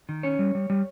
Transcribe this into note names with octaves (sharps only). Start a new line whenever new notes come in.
D#3
C#4 C#5
G3
G3
G3